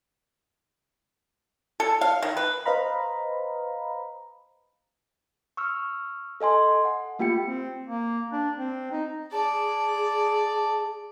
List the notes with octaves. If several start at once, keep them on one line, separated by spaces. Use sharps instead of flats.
A4
F5
D#3
B4
B4 C5 D#5 F5 A#5 B5
C#6 E6 F6
A4 D#5 G#5 C6
F#5
A3 A#3 F4 G4 G5 C#7
C4
A#3
D4
C4
D#4
G#4 D5 A5